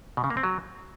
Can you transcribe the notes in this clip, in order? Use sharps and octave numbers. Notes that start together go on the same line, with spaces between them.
B2
C#3
A#3
C4
F#3